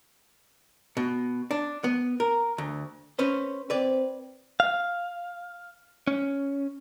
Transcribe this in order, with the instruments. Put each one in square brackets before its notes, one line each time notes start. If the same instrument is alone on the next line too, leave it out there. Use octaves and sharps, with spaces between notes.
[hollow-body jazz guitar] B2
D4
B3
A#4
D2
C#4 B4 C5
[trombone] C4 [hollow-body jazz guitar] B4 D5
[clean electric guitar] F5
C#4